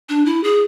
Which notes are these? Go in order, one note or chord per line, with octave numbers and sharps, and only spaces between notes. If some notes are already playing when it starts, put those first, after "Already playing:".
D4
E4
G#4